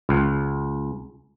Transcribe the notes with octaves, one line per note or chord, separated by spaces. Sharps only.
C#2